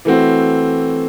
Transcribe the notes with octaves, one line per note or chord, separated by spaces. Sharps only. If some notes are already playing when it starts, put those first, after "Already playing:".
E3 A3 C4 F#4